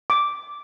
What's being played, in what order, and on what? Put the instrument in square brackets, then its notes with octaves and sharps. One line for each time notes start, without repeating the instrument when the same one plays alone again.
[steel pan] D6